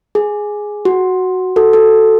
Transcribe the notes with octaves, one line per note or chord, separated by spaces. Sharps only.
G#4
F#4
F#4 A4
F#4 A4